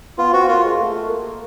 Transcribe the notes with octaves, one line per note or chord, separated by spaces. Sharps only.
B3 F4
C4 F#4
A#3 F4
G#3
A3
A#3